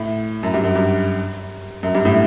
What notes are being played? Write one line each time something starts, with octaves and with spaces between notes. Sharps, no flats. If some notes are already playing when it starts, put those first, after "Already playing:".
Already playing: A2
F#2
G2
F#2
G2
F#2
G2
A2